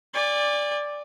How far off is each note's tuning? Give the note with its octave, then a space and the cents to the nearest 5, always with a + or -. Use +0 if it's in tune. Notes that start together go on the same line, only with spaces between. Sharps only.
D5 +0 G#5 -40